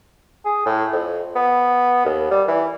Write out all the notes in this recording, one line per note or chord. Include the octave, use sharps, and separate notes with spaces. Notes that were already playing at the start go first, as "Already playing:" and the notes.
G#4
A2
F2
B3
D#2
G3
E3